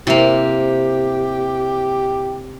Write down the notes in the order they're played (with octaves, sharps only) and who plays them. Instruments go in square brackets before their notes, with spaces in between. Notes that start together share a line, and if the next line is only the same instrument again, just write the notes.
[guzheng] C3 A#3 [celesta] E4 E5 F7 [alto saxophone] G4